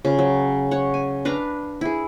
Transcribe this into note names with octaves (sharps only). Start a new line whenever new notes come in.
C#3 F4
F#3
C#5 F#5
G#5
D4 B4 F5 A#5
E4 G#4